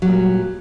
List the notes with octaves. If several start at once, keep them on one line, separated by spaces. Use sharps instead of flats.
A#2 F#3 G3